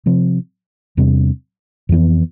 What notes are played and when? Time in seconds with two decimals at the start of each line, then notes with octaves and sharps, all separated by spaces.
0.06 C3 F3 C4
0.97 E2 C3 G3 D4
1.89 F2 E3 B3